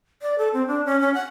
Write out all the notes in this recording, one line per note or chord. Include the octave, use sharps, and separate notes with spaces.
D5
A4
C4
D4
C#4
C#4
F#5